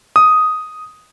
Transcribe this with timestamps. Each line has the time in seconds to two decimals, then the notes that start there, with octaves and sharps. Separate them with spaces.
0.16 D#6